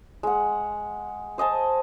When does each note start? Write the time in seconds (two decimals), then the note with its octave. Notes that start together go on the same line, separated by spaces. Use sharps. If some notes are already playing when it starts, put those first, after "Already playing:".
0.23 G#3 F#5
1.38 C5 D#5 G#5 A5